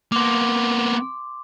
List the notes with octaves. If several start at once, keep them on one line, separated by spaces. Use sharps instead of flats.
A#3 B3 C6 D6